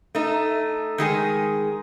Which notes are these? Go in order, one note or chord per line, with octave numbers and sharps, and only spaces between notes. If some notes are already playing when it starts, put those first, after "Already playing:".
A3 D#4
D#3 G#3 G#4